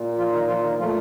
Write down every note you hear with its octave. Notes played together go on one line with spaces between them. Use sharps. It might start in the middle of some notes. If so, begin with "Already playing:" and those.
Already playing: A#2
F3 F4
D#3 D#4
F3 F4
D#3 D#4
A#2 F3 A3 F4